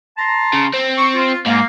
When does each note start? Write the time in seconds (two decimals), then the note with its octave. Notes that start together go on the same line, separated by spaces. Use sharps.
0.18 A5 A#5 C6
0.53 C#3
0.74 C4
0.97 C#6
1.15 F4
1.46 G#2 A#3